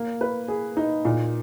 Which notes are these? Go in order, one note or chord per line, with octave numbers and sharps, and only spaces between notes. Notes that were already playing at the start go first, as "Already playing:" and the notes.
Already playing: A#3
B4
G#4
D#4
A#2